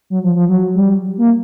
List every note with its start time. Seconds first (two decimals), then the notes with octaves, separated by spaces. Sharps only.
0.10 F#3
0.24 F3
0.36 F3
0.49 F#3
0.75 G3
1.18 A#3